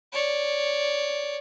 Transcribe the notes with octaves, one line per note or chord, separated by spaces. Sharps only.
C#5 D5